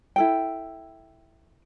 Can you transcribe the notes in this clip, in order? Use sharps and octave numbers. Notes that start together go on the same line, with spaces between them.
E4 A4 G5